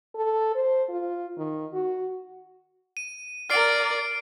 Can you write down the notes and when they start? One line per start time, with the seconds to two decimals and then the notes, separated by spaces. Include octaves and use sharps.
0.15 A4
0.55 C5
0.89 F4
1.38 D#3
1.73 F#4
2.97 D#7
3.50 A#4 D5 F6 C7 D7